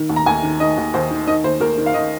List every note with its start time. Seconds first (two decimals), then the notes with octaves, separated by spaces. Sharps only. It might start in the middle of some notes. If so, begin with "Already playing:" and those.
Already playing: D#3
0.09 D#2
0.16 A#5
0.26 D#2 G#5
0.43 D#3
0.60 D#3 D#5
0.78 D#2
0.94 D#2 C5
1.11 D#3
1.27 D#3 D#5
1.44 D#2 C5
1.60 D#2 A#4
1.78 D#3
1.86 F5
1.94 D#3 D#5